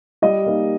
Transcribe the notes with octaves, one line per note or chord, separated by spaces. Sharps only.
G3 D#5
A#3 D#4